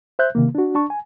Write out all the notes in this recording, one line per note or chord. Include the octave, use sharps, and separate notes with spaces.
C5 E5 F#6 G6
C3 D#3 A#3
D4 F#4
D4 A5 C#6
G#5